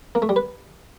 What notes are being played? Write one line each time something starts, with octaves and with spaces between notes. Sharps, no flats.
A#3
A3
G3
B4